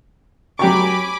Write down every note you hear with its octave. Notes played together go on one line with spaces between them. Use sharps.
F#3 G4 G#5 B5 C#6 D6